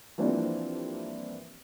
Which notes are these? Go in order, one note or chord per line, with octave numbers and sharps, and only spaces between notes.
E3 F3 G3 A#3 C4 D4